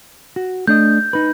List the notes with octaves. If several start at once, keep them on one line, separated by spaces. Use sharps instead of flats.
F#4
A3 D4 D#5 G6
D#4 B4